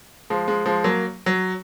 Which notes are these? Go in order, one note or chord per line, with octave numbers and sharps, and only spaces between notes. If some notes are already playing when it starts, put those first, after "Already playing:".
F3 G#3
F3 G#3
F3 G#3
F#3 A#3
F#3